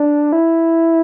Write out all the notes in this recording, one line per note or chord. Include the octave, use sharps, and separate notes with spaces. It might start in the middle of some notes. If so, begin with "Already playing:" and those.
Already playing: D4
E4